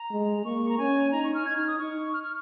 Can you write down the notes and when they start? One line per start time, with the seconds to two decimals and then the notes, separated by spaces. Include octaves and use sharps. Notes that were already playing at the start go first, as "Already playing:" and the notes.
Already playing: A#5
0.11 G#3
0.45 A#3 C#6
0.69 A#5
0.78 C#4 G#5
1.12 D#4 A#5
1.24 C#6
1.35 F6
1.45 D#4 G#6
1.57 F6
1.68 D#6
1.79 D#4 C#6
2.13 F6
2.23 F6